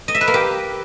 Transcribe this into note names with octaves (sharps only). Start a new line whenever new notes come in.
D#5
E5
B4
A#3
G4